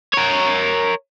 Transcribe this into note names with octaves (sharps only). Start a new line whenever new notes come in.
A#4 C#5